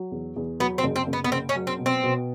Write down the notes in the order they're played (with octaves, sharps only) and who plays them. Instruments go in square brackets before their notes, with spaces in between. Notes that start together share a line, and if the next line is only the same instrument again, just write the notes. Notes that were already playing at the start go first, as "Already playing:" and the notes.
Already playing: [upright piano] F#3
E2
E2
[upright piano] F#3 [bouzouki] B3
[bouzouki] C4
[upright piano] F#1
[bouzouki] C4
[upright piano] F#1
[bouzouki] B3
B3
[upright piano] F#1 [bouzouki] C4
[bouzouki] C#4
[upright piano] F#3
[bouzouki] C4
[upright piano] B2
[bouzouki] C4
[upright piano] B2